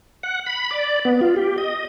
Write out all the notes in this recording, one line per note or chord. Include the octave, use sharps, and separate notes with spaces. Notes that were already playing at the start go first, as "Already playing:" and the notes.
F#5
B5
D5
B3
F4
G4
D#5